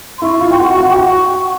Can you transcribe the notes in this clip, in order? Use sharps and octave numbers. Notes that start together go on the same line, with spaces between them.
C6
E4 E5 C#6
F4 F5
G5 C6
F#4 F#5 C#6
F#4 F#5
G5 D6
F#4 F#5 C#6